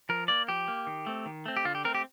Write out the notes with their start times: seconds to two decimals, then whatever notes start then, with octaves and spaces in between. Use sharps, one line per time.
0.09 F3 A#4
0.28 A#3 D5
0.48 F3 G4
0.68 A#3
0.87 D#3
1.07 A3 C4
1.26 D#3
1.46 A3 C4
1.57 G4
1.65 D3 F4
1.75 G4
1.85 A3 C4 A#4
1.95 G4